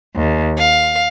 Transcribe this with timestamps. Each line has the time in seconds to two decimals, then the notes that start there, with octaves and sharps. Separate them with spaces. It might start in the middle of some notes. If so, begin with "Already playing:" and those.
0.14 D#2
0.57 F5